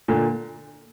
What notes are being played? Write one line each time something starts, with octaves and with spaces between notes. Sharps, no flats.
A#2 D3